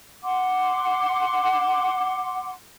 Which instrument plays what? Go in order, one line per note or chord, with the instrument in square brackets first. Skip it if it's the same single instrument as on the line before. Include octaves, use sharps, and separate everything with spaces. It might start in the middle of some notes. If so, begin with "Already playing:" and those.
[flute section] F#5 C6 D6